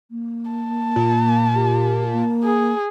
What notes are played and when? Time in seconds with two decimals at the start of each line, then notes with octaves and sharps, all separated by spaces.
0.11 A#3
0.52 A5
0.96 A#2
1.55 G4
2.12 A#3
2.44 G#4